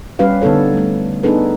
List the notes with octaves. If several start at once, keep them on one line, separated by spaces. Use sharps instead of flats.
G3 C#4 G4 B4 F5
D3 B3 D#4 A4 C#5
G3 A3
B3 D4 D#4 G#4 A4 B4